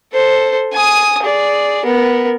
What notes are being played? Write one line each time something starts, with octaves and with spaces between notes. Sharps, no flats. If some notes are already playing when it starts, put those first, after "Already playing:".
A4 C5
G#5 D#6
G#4 D5
B3 A#4